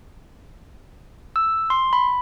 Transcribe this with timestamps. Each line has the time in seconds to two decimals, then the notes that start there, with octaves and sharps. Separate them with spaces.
1.36 E6
1.70 C6
1.93 B5